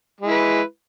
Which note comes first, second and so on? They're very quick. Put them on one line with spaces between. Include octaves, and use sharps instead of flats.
G#3 E4 B4